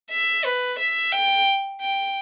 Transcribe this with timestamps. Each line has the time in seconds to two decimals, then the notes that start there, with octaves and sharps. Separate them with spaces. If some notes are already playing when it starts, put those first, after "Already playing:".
0.11 E5
0.45 B4
0.80 E5
1.13 G5
1.81 G5